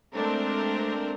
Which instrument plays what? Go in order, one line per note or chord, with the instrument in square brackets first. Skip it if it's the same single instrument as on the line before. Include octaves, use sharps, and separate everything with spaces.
[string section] G#3 A3 C4 D4 A#4